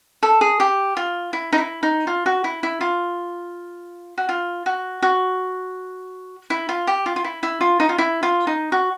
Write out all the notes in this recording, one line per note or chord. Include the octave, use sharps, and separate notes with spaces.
A4
G#4
G4
F4
E4
D#4
E4
D#4
F4
F#4
E4
E4
F4
F#4
F4
F#4
F#4
E4
F4
G4
F4
F4
E4
E4
F4
D#4
F4
E4
F4
D#4
F#4